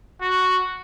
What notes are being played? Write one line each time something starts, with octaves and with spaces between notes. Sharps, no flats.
F#4